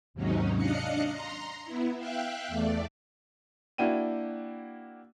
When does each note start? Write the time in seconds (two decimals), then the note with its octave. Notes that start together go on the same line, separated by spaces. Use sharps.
0.14 D#2 G#2 C3 F#3 C#4 D#4
0.56 D4 D#5 F5 F#6 C#7
1.08 A#5 C6
1.65 B3 E4
1.97 E5 F5 G5 F#6
2.48 E2 A3 D5
3.78 A#3 D4 E4 F#4 G5 D#7